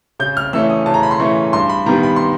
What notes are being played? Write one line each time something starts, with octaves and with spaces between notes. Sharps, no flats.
C#3 G6
F6
E3 A3 C#4 E6
D#6
C#3 A5
A#5
B5
C6
E3 A3 C#4 C#6
G2 C6
B5
D#3 G3 B3 A#5
B5
C6